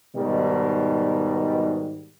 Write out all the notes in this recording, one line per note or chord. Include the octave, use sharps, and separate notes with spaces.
G#2 B2 D#3 G3